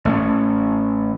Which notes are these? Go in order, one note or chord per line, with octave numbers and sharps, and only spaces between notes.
A1 A3 C#4